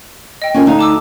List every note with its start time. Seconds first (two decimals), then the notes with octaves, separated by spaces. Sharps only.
0.42 D#5 G5
0.54 C#4 F4 A#4
0.66 D2 D#4 F5
0.79 A5 D6 E6